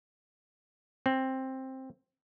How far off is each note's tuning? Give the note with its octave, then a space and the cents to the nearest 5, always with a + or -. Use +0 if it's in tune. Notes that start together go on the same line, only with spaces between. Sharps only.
C4 +10